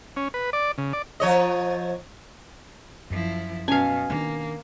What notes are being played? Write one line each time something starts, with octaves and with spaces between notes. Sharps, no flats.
C#4
B4
D5
C#3
D5
F3 C#5 D#5
F#2 F3 E4
B2 C#4 F5 G#5
D#3 A#3 D4